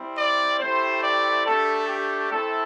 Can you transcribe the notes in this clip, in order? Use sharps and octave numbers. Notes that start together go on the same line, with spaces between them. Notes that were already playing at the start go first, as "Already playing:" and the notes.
Already playing: G3 C4 E4
D5
A3 C4 E4 G4 C5
D5
A3 D4 G4 A4
G4
A3 C4 E4 A4